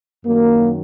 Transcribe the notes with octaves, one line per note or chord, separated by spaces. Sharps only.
F#2 D#3 F#3 A#3